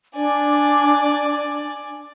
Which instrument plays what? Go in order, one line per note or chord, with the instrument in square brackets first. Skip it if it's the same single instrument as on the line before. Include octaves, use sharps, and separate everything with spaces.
[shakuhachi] D4 [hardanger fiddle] D5 G#5